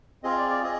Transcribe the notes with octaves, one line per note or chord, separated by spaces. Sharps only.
C4 F4 G#4 D#5
D5
D5
G#4 D#5